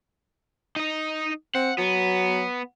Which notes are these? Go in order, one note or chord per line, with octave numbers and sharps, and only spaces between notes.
D#4 D#5
C4 F#5
F#3 B3